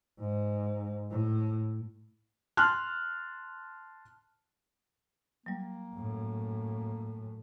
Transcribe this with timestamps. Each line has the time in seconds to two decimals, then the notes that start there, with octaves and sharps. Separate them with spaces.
0.20 G#2
1.10 A2
2.57 A5 C6 F6 F#6
5.46 F#3 G3 A#3
5.94 F#2 A2